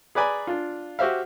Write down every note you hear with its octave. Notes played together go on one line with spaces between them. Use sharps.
G#4 B4 D5 G#5 A#5 B5
D4 F4
F#4 G4 C5 E5 F5